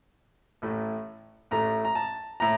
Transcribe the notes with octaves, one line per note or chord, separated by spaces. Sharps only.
A1 A2 A3
A1 A2 A3 A#5
A#5
A5
A2 A#5